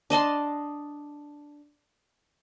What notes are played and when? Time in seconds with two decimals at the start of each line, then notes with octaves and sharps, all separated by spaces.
0.10 D4 D#5 A5 C6